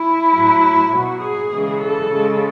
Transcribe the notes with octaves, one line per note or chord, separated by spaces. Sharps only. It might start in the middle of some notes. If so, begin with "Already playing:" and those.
Already playing: E4
A2 F#3
B2 F#3 F#4
G#4
C#3 E3 G#3
A4
C#3 G#3